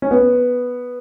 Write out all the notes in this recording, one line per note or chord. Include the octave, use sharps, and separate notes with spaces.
C#4
B3